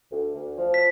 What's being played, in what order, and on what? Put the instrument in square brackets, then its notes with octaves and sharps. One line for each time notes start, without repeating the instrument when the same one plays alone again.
[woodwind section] D2
D2
F3
[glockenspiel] B6